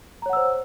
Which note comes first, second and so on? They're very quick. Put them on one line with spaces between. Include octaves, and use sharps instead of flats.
A#5 C#5 F#5 E6 C5